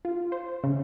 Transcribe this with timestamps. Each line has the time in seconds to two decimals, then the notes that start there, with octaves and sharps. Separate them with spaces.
0.05 F4
0.32 C5
0.64 C#3